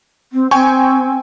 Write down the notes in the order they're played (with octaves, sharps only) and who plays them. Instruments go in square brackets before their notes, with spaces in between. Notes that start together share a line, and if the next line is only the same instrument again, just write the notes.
[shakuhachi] C4
[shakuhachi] C4 [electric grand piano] G5 G#5 C#6